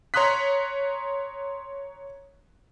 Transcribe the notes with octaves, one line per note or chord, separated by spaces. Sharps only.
C#5 A#5 C6 D#6 F#6 B6